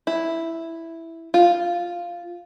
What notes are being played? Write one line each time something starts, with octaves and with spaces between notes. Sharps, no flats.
E4
F4